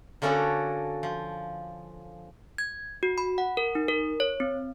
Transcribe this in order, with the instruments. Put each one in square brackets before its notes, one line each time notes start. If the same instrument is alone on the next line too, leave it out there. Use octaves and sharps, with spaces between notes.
[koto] D3 A#3 C#4 F#4 A4 D5
F3
[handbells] G#6
F#4
B5
F#5
A#4
D#4
A#4
C#5
C4